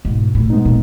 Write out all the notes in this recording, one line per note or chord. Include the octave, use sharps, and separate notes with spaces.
G#2 B2
A2
G#3 B3 D#4
A#2